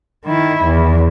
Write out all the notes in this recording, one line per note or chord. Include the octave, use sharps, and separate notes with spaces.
D#3 E4
E2